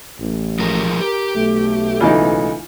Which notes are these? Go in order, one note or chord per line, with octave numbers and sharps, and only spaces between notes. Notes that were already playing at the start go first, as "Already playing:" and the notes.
A1
F3 G#3 A#4
G4 A#4
B1 A3
C#2 E3 D#4